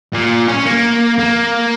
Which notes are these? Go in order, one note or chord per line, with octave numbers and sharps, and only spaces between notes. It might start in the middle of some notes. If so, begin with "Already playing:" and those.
A#2
C#4
A#3
A#3